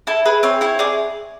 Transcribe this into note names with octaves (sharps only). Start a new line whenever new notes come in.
E4 A4
G#4 B4
C4 C#5
E4 C#5
G#4 D5